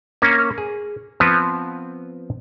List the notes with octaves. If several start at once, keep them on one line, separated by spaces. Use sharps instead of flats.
A#3 C#4
G#4
F3 B3 C4 B4